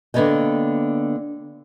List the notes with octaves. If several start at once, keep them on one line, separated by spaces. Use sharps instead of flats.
D3 A#3 B3 C#5 D#5 G5